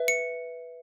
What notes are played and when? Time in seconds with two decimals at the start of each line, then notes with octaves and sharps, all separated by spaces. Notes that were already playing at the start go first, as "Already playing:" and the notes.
Already playing: B4 E5
0.08 C#7